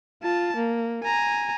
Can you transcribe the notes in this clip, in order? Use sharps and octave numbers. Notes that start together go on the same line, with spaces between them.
F4 A5
A#3
G#5 A#5